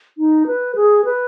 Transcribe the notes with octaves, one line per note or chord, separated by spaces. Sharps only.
D#4
B4
G#4
B4